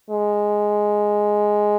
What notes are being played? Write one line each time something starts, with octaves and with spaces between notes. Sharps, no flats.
G#3